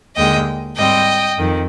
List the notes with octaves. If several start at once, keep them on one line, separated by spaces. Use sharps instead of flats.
D#2 D3 G#3 D#5 G5
G#2 G3 C4 D#5 G5
F2 D#3